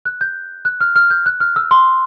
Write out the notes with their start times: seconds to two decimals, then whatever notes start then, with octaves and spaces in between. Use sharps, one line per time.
0.05 F#6
0.21 G6
0.65 F#6
0.81 F6
0.96 F6
1.10 G6
1.26 F#6
1.40 F6
1.56 E6
1.71 C6